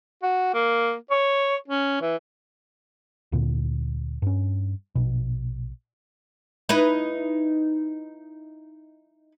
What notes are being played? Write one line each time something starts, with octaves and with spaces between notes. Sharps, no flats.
F#4
A#3
C#5
C#4
E3
D2 A#2 D3
G2 C#4
A#1 B2
D#4 E4 B4